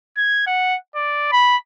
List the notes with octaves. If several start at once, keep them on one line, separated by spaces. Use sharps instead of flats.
G#6
F#5
D5
B5